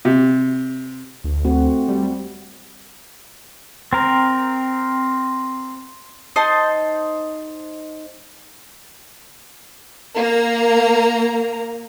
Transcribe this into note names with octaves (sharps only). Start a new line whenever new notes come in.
C3
D2
A3 C4 F#4
G3
C4 A#4
D#4 C5 D#5 A5
A#3 A#5